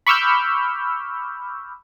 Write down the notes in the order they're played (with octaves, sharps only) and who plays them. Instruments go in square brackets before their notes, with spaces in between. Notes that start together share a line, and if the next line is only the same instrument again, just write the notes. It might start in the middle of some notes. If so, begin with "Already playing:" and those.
[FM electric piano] B5 C#6 D6 E6 F6 G6